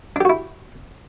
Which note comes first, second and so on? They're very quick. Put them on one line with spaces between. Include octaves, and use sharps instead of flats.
D4 G4 F#4 E4